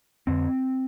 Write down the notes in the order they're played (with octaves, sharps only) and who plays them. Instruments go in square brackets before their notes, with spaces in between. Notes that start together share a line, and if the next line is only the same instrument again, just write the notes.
[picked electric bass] F2 D3 C4